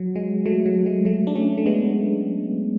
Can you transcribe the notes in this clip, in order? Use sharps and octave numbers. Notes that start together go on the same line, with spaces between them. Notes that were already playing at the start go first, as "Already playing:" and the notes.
Already playing: F#3
G#3
F#3 A3
F#3
G#3
F#3 A3
D4
A3 C#4
A3
G#3 B3